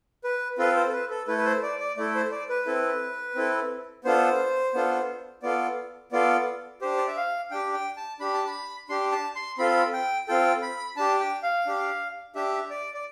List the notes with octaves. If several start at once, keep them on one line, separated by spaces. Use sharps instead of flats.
B4
C4 F4 A4 B4
C5
A4
B4
A4
A3 E4 A4 B4
B4
C5
D5
D5
A3 E4 A4 D5
C5
D5
B4
C4 E4 A4
C4 E4 A4
B3 D4 F4 A4 C5
B3 D4 F4 A4
B3 F4 A4 D5
B3 F4 A4 D5
D4 G4 C5
D5
E5
F5
D4 G4 G5
G5
A5
D4 G4 B5
A5
B5
D4 G4 C6
A5
C6
C4 F4 A4 B5
G5
C4 F4 A4 G5
B5
D4 G4 A5
G5
F5
D4 G4
D4 G4 E5
D5
D5